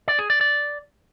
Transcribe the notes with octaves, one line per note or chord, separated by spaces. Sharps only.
D5
G#4
D5
D5